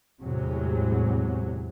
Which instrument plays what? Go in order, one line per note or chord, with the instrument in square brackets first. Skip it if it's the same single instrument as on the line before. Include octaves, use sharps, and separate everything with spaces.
[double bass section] E2 A2 C3 F#3 G#3